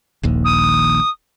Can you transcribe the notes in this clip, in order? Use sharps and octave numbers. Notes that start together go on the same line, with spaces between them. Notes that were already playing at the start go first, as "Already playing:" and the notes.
D#1 A#1 D#2
D#6